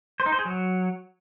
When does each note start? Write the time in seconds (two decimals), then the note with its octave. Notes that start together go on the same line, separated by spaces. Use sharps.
0.20 C5
0.26 D#4
0.32 C5
0.39 G#4
0.45 F#3